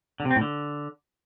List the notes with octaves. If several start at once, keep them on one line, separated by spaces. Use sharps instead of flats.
D3
C3
C4
A2
D3